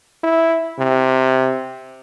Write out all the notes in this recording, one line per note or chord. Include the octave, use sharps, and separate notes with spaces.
E4
C3